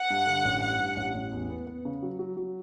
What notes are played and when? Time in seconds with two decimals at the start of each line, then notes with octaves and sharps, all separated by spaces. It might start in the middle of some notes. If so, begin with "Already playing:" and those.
Already playing: F#5
0.10 G2
0.26 D3
0.45 A1
0.62 G2 F#5
0.79 G2
0.96 A1
1.14 A1
1.32 E2
1.49 B3
1.67 B3
1.85 C#3
2.02 F#3
2.19 F#3
2.37 F#3